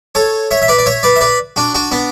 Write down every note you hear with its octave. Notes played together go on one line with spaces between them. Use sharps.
A4 C#5
C#5 E5
E5
B4 D5
D5
C#5 E5
B4 D5
E5
B4 D5
D4 F#4
D4 F#4
B3 D4